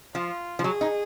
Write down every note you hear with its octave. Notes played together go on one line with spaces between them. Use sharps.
F3 F4
F3
F#3 G#4
D#4